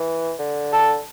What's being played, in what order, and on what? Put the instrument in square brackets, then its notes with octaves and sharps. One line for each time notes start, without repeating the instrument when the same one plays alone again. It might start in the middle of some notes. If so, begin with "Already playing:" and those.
Already playing: [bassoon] E3
D3
[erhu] A4